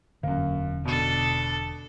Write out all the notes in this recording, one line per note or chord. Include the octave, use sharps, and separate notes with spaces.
E1 F#2 D3 A#3
B2 D4 A4